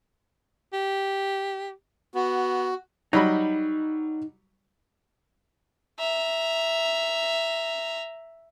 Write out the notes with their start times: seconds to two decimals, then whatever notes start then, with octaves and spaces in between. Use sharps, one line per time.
0.73 G4
2.15 B3 F#4
3.13 F#3 G3 D#4 D#5 B5
5.98 E5 A#5